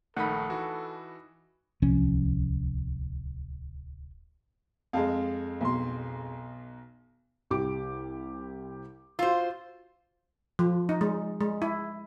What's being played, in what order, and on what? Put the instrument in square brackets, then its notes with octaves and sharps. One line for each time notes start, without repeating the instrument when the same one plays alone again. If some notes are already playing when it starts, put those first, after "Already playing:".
[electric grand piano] A#1 D#3 A3 [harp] D#4 D#5 B5 [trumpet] A4 [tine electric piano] F#5
[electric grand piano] E3 F#4
[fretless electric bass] D1 C2 F3 C#4
[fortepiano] F2 G#3 [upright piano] F5 A5
[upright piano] B1 B2 C6
[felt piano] C2 G4 D6
[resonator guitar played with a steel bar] F4 C5 [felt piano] F#4 E6
[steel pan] F3
D#4
G#3
G#3
E4